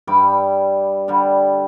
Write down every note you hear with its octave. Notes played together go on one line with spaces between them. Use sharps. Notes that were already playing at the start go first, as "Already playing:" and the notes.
G2 G3 B5 D6
D3 G3